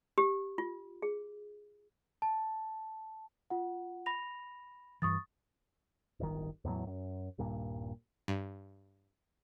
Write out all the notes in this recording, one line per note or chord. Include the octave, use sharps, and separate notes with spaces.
G4
F4
G#4
A5
F4 F#5
B5 A#6 F7
G2 E3 C#6 D#6 A6
D1 G1 D#3
E2 A2 C3 F#3
F#2
D#1 G2 A#2
G2